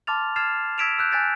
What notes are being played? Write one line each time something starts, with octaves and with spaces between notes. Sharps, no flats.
A5 C6 D6 F6 A6 F7
F6 G#6 A6 C7 E7 F7
E6 G#6 B6 D7 E7 F7
E6 F#6 G6
G#5 F#6 G6 A6 B6 D7